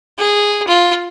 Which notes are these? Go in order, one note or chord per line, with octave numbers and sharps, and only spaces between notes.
G#4
F4